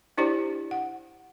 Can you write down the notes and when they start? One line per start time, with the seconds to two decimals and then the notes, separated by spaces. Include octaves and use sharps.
0.18 D4 E4 G4 C5 D5
0.71 F#5